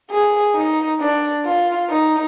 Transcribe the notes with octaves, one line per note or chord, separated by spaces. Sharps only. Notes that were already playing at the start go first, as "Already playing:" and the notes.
G#4
D#4
D4
F4
D#4